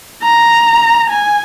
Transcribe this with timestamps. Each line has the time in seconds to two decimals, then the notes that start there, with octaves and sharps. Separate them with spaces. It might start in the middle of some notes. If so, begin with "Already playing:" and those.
0.23 A#5
1.10 G#5